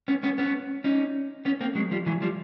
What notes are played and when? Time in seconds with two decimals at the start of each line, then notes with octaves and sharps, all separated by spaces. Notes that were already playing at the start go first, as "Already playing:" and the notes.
0.08 B3 C#4
0.23 B3 C#4
0.38 B3 C#4
0.84 C#4 D#4
1.45 B3 C#4
1.61 A#3 C4
1.75 F#3 G#3
1.91 F3 G3
2.06 E3 F#3
2.22 F3 G3